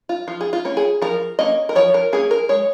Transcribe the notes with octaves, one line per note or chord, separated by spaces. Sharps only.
F4
F3 F4
G#4
F4
A#3 C#4
G#4
F3 A#4
A#3 C#4 D#5
A#4
F3 C#5
A#4
A#3 C#4 G#4
A#4
G#3 C#5